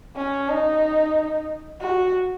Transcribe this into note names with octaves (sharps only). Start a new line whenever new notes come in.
C#4
D#4
F#4